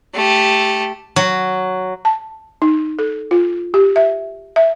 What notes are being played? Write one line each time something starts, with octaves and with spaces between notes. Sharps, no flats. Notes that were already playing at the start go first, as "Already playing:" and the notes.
A3 G4
F#3
A5
D#4
A4
F4
G4
E5
E5